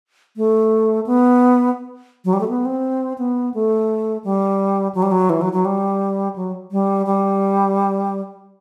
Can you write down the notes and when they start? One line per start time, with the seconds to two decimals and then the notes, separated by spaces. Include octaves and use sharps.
0.37 A3
1.06 B3
2.25 F#3
2.33 G3
2.41 A3
2.48 B3
2.65 C4
3.18 B3
3.54 A3
4.24 G3
4.95 F#3
5.03 G3
5.12 F#3
5.30 E3
5.41 F#3
5.53 F#3
5.65 G3
6.36 F#3
6.72 G3
7.06 G3